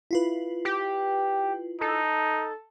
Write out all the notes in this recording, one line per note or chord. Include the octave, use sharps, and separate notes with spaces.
E4 F4 B4
G4
D#4 A4